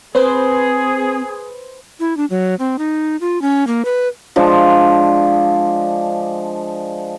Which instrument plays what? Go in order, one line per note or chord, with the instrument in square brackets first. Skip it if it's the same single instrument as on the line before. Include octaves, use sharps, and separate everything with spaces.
[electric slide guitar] C4 [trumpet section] G#4 [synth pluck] B4 C5
[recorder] E4
D4
F#3
C4
D#4
F4
C#4
A#3
B4
[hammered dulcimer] F3 G#3 D4